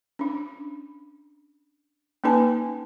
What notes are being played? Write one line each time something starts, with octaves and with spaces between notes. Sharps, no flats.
C#4 D4
A#3 C#4 D#4 B4 G#5 A5